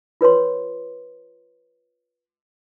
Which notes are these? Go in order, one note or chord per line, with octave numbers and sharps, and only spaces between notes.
F4 B4 C#5 C6